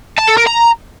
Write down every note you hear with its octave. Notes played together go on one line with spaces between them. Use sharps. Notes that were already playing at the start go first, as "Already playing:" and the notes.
A5
A4
A#4
A#5